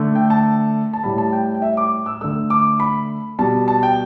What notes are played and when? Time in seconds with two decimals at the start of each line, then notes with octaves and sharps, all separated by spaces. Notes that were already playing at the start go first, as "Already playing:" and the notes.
Already playing: D3 A3
0.15 G5
0.30 A5
0.93 A5
1.03 A2 G3 B5
1.18 A5
1.33 G5
1.54 G5
1.62 E5
1.77 D6
2.06 E6
2.21 D3 A3 E6
2.50 D6
2.80 B5
3.39 B2 G3 A5
3.68 A5
3.83 G5